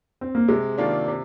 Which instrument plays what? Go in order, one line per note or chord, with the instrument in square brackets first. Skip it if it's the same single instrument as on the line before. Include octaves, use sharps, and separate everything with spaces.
[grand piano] C4
A#3
[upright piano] C3 [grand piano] G#3
[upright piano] D#3 A#3 D4 F4
C3